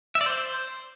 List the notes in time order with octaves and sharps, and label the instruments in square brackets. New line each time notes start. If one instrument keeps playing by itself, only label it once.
[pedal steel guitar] E5
D5
C5